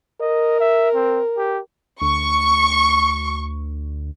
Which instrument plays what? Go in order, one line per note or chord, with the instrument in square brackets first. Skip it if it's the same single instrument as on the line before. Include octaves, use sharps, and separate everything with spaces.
[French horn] A#4 [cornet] D#5
[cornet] E5
C4
G4
[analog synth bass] D2 [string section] C#6